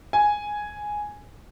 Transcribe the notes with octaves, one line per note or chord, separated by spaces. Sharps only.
G#5